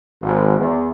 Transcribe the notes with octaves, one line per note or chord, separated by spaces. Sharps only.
G#1
E2